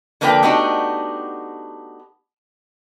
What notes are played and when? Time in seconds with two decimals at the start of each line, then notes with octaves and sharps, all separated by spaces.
0.21 D3 F3 A#3 B4 C#5 G5
0.43 A3 B3 D4 D#4 F#4 G4